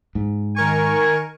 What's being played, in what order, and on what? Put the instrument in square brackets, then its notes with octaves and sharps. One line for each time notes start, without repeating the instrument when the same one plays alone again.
[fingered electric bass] G#2
[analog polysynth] D#3 A#4 C#6 [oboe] G#5